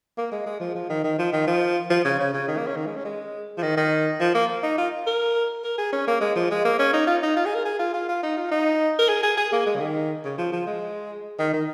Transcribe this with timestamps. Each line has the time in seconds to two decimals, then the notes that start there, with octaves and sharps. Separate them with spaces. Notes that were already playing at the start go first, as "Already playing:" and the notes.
0.18 A#3
0.32 G#3
0.46 G#3
0.60 F3
0.75 F3
0.90 D#3
1.04 D#3
1.18 F3
1.33 D#3
1.47 F3
1.90 F3
2.05 C#3
2.19 C#3
2.34 C#3
2.48 D#3
2.57 A#3
2.67 C#4
2.76 D#3
2.86 G#3
2.96 C#4
3.05 G#3
3.57 F3
3.63 D#3
3.77 D#3
4.20 F3
4.35 A#3
4.63 D#4
4.78 F4
5.07 A#4
5.64 A#4
5.78 G#4
5.93 C#4
6.08 A#3
6.21 G#3
6.36 F3
6.50 G#3
6.65 A#3
6.79 C#4
6.93 D#4
7.07 F4
7.23 D#4
7.36 F4
7.45 G#4
7.55 A#4
7.65 G#4
7.79 F4
7.94 F4
8.09 F4
8.23 D#4
8.37 F4
8.51 D#4
8.98 A#4
9.09 G#4
9.23 G#4
9.37 G#4
9.52 A#3
9.66 G#3
9.76 C#3
9.80 D#3
10.24 C#3
10.38 F3
10.52 F3
10.67 G#3
11.39 D#3
11.53 D#3